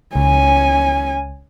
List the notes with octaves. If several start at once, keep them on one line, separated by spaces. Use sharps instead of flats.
C#2 C#4 G#5